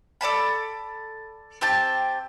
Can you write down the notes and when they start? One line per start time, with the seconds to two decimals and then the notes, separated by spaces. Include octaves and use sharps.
0.21 A4 D5 A5 B5
1.61 C4 G4 G5 A5